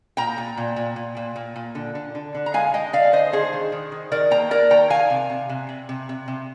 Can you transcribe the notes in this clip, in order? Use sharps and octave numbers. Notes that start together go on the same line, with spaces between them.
A#2 G5 A#5
A#2
A#2
A#2
A#2
A#2
A#2
A#2
D3
D3
D3
D3
A#5
G#3 F5 G#5
G#3 D#5 G5
D3 D5 F5
D3 C5 D#5
D#3 G#4 C5
D#3
D#3
D#3
D#3 A#4 D5
A#3 G5 A#5
A#3 A#4 D5
D#3 G5 A#5
D#3 F5 G#5
C3
C3
C3
C3
C3
C3
C3